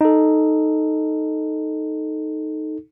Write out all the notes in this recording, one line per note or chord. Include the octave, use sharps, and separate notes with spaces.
D#4 A4